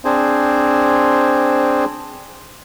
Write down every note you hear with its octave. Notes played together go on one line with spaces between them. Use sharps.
C4 D4 G#4 C5